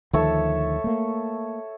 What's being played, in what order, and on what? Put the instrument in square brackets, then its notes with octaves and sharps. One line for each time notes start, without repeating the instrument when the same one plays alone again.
[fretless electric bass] D2 D#3 F3 [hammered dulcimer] A4 C#5 E5
[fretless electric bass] A3 A#3